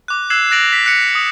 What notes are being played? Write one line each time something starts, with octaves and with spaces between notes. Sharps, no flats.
D6 F#6
E6 F#6 G#6 C7 E7 F#7
F#6 A6 A#6 D7 F7 F#7
B6
F#6 C#7
D#6